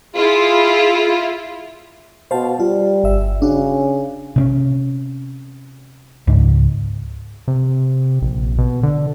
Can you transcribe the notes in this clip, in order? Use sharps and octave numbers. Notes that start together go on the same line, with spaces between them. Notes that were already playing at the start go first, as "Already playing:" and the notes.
E4 F4 G#4
B2 C5 F5 A5
G3 F4
G1 E5
C#3 D4 F#4
C3 C4 C#4
C#2 G#2
C3
A#1
B2
D3